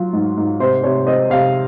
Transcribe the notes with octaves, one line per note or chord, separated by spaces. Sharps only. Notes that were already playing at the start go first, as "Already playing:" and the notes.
Already playing: F#3 F4
G#2
G#2
C3 C5
C3 C#5
C4 D#5
C3 F5